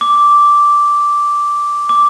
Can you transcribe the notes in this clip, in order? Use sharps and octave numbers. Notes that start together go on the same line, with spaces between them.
D6
D6